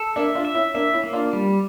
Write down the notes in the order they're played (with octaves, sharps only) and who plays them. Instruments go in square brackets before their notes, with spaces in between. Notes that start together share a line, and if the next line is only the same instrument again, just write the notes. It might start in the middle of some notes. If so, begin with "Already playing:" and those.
Already playing: [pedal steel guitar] A4
[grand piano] A#3 D4 [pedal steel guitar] E5
[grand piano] D4 F4
[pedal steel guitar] E5
[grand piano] C#4 E4
[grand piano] A#3 D4 [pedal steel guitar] E5
[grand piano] C#4 E4
[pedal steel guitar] A#3
[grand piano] D4 F4
[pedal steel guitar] G3